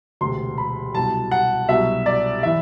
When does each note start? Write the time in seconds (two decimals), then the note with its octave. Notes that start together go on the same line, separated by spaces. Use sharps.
0.21 E1 D2 C3 C6
0.58 B5
0.95 C2 B2 F#3 A5
1.31 F#5
1.69 C2 B2 F#3 E5
2.06 D5
2.43 E3 E5